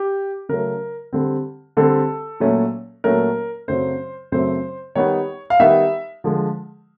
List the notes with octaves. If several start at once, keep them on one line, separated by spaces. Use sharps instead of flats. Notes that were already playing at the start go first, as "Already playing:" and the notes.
Already playing: G4
C#3 F#3 A3 A#4
D3 G3 C4
D3 G3 C4 A4
A#2 F#3 A3 C#4
A#2 F#3 A3 C#4 A#4
F#2 C#3 F#3 A3 C4 C5
F#2 C#3 F#3 A3 C4 C5
D#3 G3 B3 D#4 C#5
F5
D#3 G3 B3 D#4 E5
D3 F3 G#3